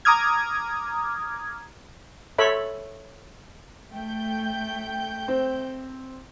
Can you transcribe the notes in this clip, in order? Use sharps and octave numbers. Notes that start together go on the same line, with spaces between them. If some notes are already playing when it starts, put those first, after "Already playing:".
A#5 D6 D#6 F6 G#6
A4 C#5 E5 B5
A3 G5 G6
C4